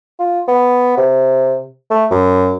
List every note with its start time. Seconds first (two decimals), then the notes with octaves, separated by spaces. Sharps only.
0.19 F4
0.48 B3
0.97 C3
1.90 A3
2.11 F#2